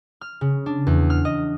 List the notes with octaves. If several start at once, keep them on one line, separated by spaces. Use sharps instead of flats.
F6
C#3
D4
E2
F6
D#5